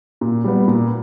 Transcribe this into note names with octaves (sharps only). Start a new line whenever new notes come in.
A#2
G3 B3
A#2